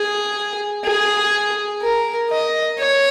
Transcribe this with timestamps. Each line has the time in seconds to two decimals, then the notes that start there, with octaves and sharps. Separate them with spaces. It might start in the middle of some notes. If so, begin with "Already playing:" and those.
Already playing: G#4
0.85 G#4
1.82 A#4
2.30 D#5
2.79 C#5